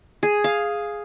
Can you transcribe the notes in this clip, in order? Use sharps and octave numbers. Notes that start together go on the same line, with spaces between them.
G#4
F5